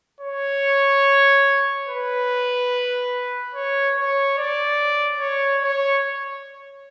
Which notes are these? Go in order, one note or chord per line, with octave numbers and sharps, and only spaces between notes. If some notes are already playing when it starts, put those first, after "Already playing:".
C#5
B4
C#5
C#5
D5
C#5
C#5